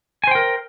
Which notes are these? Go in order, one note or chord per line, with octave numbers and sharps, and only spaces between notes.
A#4 C5 G5 G#5